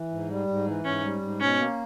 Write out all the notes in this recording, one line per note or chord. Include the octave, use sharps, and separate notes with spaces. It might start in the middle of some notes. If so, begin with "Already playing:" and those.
Already playing: E3
G#2
G3
G#2
E3
G#2 C#4
G3
G#2
B2 C#4
A#3